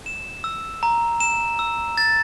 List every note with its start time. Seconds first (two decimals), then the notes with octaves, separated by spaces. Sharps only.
0.06 E7
0.44 E6
0.83 A#5
1.20 E7
1.59 E6
1.98 A6